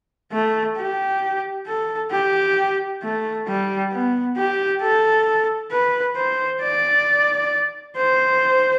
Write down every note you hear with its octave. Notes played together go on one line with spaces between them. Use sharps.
A3
G4
A4
G4
A3
G3
B3
G4
A4
B4
C5
D5
C5